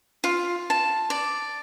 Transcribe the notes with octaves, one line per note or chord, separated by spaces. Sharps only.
F4
A5
D5